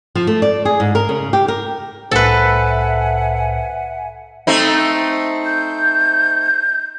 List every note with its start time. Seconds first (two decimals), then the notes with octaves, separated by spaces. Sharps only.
0.15 F3
0.27 A3
0.42 D5
0.65 G#4
0.80 G#2
0.95 A#4
1.09 C#3
1.33 G4
1.48 A#4
2.11 C2 A2 A4 B4 C5 E5 F#5 G#5
4.47 A3 C4 D#4
5.45 G6